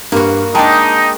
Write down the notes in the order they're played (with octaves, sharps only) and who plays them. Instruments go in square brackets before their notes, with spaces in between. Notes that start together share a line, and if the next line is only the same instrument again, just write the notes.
[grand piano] G2 [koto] A#3 F#4
[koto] G#3 D4 [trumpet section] D#4 [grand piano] G5 A5 A#5